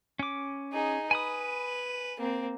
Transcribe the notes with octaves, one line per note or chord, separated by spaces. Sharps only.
C#4 D6
D#4 G#4
B4 G#5 B5 D#6
A#3 C4